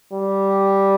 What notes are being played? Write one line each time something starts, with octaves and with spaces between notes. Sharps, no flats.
G3